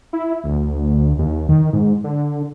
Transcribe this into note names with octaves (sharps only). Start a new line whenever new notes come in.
E4
D2
D#2
D#3
G#2
D3